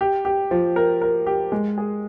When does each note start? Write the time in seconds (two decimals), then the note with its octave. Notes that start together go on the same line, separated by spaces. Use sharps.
0.01 G4
0.25 G4
0.51 F3
0.76 A#4
1.02 A#4
1.27 G4
1.52 G#3
1.78 G#4